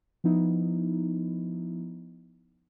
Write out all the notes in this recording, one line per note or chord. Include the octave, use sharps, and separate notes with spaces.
F3 B3 D#4 E4